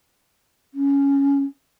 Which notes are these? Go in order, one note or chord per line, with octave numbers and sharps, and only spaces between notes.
C#4